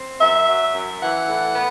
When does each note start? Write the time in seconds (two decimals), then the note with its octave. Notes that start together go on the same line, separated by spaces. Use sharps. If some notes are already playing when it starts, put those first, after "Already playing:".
Already playing: C4
0.20 F#2 E5
0.47 F#3
0.74 F#2
1.00 E3 F#5
1.27 A2
1.54 B3